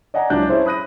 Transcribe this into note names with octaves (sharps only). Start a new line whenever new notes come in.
D5 D#5 F#5 G#5 A#5
C#2 F#3 D4 E4 F#6 G6
C#4 E4 G#4 C5
B5 D#6 F#6 A#6 D#7